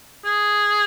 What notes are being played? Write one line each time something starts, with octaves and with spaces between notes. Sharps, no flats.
G#4